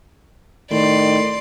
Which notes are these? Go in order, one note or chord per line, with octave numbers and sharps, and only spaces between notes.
A2 D#3 D5 C6